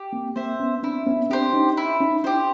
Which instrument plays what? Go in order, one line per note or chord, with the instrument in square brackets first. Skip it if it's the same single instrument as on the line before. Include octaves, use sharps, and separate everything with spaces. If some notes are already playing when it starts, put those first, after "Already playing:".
Already playing: [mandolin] G4
[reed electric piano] A#3 C4
[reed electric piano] A#3 C4 [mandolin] C5 E5
[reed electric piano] B3 C#4
[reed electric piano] C4 D4 [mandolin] E4
[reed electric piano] B3 C#4
[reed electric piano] C4 D4 [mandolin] G4 C5
[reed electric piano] C#4 D#4
[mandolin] E4
[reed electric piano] C#4 D#4
[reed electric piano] D4 E4 [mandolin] G4 C5